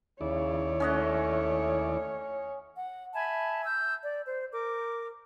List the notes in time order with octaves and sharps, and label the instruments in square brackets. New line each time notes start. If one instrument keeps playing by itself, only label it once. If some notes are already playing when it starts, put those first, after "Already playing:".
[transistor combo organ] D#2 E4 D5 [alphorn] C#3 [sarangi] C#5
[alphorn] A3 [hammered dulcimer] C#4 D#5 F#5
[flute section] F#5
E5 G#5 A5 B5
E6 G6
D5
C5
A#4 D6